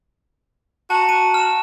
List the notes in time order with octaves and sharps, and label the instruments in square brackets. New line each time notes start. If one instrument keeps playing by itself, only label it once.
[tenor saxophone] F#4 [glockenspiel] A5 A#5
[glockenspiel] D#7
F6 E7